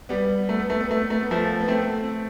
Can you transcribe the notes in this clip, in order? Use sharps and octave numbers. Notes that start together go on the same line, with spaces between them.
G3 B3
A3
B3
A3
B3
A3
B3
A3
B3
F3 A3
B3
A3 C4